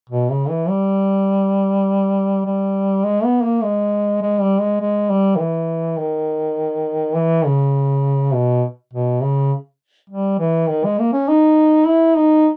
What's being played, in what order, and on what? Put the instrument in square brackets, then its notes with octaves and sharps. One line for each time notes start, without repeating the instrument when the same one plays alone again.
[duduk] B2
C#3
E3
G3
G3
G#3
B3
A#3
G#3
G#3
G3
G#3
G#3
G3
D#3
E3
D#3
E3
C#3
B2
B2
C#3
G3
E3
D#3
G#3
A#3
C#4
D#4
E4
D#4